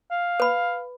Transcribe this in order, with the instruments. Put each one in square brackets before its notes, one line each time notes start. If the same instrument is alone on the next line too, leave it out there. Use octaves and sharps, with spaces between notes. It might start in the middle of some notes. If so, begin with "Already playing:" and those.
[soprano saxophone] F5
[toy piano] B4 B5